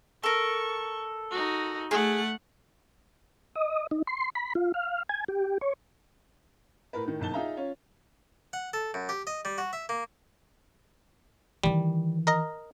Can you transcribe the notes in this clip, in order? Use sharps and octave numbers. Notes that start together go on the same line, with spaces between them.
A4 A#4 C#6
D#4 F#4
A3 G#4 F#5
D#5
D#4
C6
B5
F4
F5
G#5
G4
C#5
A2 A#4 B4
A2 D#3
F#1 B1 A5 G7
D#4 F4 G#4 E5 F5 A#5
C#4 F4 C#5
F#5
A4
F#2
G4
D#5
G3
F#4
E5
A#3
D#3 E3 G3
A#4 D#5 A#5